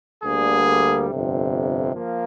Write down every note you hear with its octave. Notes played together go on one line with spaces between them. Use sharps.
D2 D3 G3 A#3 G#4
G1 F2 C3
F3 A#3